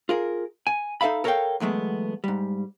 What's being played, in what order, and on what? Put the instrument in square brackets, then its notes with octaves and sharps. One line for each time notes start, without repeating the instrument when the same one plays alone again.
[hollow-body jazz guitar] F4 G#4 A#4
G#5
D#4 A4 E5 F5 B5
A4 A#4 C#5 D#5 F5 G5
E2 F#3 G#3 A3 B3
G#2 G3